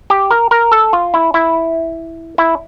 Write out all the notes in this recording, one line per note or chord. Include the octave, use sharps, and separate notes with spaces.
G4
A#4
A#4
A4
F4
E4
E4
E4